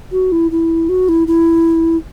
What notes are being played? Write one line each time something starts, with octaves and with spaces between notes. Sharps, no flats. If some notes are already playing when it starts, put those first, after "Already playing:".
F#4
E4
E4
F#4
E4
E4